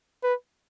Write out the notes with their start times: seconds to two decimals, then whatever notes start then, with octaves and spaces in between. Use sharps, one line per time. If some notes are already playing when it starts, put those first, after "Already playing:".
0.23 B4